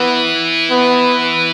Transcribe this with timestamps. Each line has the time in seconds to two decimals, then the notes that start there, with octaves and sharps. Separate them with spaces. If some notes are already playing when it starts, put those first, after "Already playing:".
Already playing: E3 B3
0.70 B3